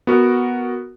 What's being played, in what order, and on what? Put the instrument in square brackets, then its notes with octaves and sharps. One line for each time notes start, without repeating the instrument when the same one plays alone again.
[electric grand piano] B3 F#4 A#4